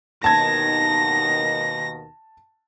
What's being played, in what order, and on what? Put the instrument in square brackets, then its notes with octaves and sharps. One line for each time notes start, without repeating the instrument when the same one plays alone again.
[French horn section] D#2 B2 D#3 [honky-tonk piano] A5 G#6 [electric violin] A#6